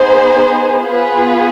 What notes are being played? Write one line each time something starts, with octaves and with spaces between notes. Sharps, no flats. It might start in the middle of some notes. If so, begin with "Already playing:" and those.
Already playing: B3 D#4 G#4 C5
B3 F4 G#4 B4